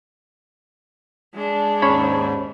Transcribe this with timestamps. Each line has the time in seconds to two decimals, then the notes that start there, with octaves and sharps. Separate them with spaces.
1.34 G#3 D4
1.82 D#2 G#2 C#4 C#5 B5